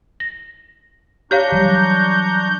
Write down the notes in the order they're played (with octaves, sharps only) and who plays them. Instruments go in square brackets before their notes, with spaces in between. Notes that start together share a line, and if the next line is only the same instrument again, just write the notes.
[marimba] A#6
[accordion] D4 A#5 C#6 [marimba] G4 C#5 F5 [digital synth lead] G6
[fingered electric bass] E3 F#3 G3